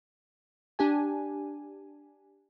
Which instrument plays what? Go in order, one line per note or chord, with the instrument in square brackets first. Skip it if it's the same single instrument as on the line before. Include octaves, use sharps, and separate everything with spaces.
[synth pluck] D4 G4 G#5